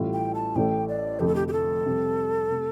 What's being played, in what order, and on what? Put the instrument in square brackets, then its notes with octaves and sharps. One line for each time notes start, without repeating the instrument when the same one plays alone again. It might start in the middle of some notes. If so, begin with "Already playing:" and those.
Already playing: [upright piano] A1 A2 G3 F4
[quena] G5
A5
[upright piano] A1 A2 A3 [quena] G5
[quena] D5
[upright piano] F1 F2 D3 A3 [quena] G4
[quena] A4
G4
G4
A4
[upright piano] F2 C3 G3 C4 G4
C3 A3